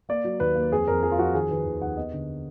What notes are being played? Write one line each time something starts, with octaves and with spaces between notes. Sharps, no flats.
A#3 D5
F#3
D#2 B4
A#3
F2 G#4
F2 A#4
F3 G#4
F4
F3 F#4
D#3 G#4
D#3 B4
D#2
D#2 F#5
B3 D#5
D3